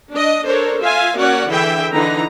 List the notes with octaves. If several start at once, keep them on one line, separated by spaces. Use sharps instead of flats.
D4 D#5
D4 A4 A#4 C5 C#5
F4 E5 F5 G#5
A#3 C#4 F#4 C#5 D5 F#5
D3 E3 E4 G#4 E5 G5
D3 E3 D#4 B4 A#5